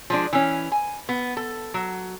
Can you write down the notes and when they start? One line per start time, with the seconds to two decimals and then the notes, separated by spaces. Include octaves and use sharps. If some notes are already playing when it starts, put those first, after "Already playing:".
0.10 F3 G#3 D4
0.33 E3 C#4
0.72 G#5
1.09 B3
1.37 A4
1.74 F#3